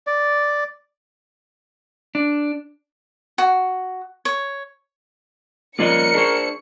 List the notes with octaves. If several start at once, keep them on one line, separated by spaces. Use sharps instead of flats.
D5
D4
F#4
C#5
F3 A#3 C#4 A#4 D5 D#5 C7 C#7
D4 G#4 C5 C#6